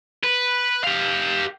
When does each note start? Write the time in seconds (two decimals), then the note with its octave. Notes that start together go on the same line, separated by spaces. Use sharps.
0.23 B4
0.84 G4 F5